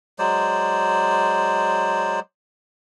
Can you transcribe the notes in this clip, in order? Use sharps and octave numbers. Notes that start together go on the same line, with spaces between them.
F#3 G#3 C5 D5